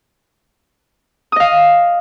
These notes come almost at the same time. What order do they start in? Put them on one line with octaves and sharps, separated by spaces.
D#6 D#5 F5